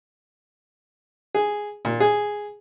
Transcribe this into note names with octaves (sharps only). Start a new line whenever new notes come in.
G#4
A#2
G#4